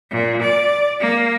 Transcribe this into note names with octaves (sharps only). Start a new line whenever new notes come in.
A#2
D5
A#3